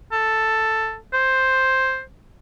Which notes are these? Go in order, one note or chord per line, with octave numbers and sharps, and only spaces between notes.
A4
C5